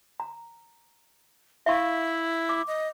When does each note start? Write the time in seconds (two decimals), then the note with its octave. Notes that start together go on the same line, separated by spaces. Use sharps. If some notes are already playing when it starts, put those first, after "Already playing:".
0.20 A#5
1.66 E4 E5 F5 C#6
2.49 D6
2.67 D#5